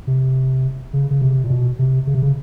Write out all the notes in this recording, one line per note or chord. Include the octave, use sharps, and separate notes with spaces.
C3
C#3
C#3
C3
A#2
B2
C3
C#3
C3
C#3